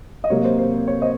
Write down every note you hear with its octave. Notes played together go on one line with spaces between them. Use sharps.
D#5
C3 F#3 A#3 C#5
C5
C5
C#5
C5 D#5